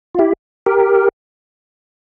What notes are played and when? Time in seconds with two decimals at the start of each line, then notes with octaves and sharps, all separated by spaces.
0.15 F4
0.19 E4 G4
0.66 G4 A#4